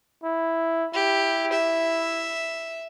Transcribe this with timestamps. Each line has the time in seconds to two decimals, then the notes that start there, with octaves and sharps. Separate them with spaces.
0.23 E4
0.94 E4 G4
1.52 E5